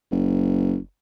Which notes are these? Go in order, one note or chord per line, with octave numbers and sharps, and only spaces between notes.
F#1